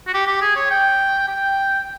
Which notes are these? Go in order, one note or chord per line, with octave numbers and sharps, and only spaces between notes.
F#4
G4
G4
G#4
C#5
G5
G5